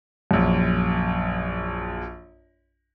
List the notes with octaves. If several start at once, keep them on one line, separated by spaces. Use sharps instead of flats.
A#1 F#2